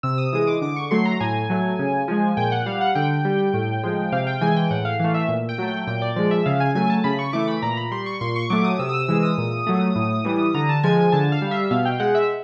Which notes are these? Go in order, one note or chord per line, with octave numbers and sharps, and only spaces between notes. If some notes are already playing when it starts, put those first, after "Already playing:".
C3 E6
D#6
E3 G#3 D#6
D6
D3 D6
C#6
F#3 A3 C6
A#5
A2 G#5
F#3 A3
C#3
F3 G#3
A#2 G5
F#5
G3 F5
F#5
D3 G5
G3
A2
F3 G#3
C3 F5
G5
E3 G#3 G#5
G5
A2 F#5
F5
E3 A3 F5
E5
A#2
G5
F#3 A3
G5
A#2 G5
D5
F3 G#3 D5
E5
C#3 F5
G#5
F#3 A3 G#5
A5
C#3 B5
C#6
E3 A3 D6
B5
A#2 A#5
B5
G3 C6
C#6
A#2 C6
C#6
F#3 A3 D6
D#6
C3 E6
D#6
E6
E3 G#3 E6
D#6
A#2
F#3 A3
A2
E3 G3
D3 A#5
A5
F3 G#3 G#5
G#5
D3 A5
F5
G3
E5
B2 F5
G5
G#3 F#5
E5